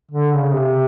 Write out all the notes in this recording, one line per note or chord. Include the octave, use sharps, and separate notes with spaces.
D3
C#3
C3